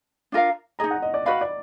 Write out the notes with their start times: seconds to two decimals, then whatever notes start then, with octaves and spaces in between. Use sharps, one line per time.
0.32 D4 F4 A#4 F5
0.79 D#4 G#4 D#5 A#5
0.91 F#5
1.02 D#5
1.14 D5
1.26 F#4 B4 D#5 F5 B5
1.41 D5